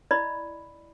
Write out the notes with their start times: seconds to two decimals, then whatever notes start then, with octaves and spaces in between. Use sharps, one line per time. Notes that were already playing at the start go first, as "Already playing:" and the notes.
0.11 E4 D5 D#5 B5